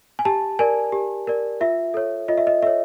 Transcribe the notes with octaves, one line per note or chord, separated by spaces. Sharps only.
G#5
G4 A5
A#4 D5 G#5
G4
A#4 D5
F4 E5
A4 C#5
F4 D#5
E5
D#5
A4 C#5 E5